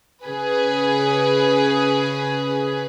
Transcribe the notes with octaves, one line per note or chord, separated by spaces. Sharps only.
C#3 G#4 B4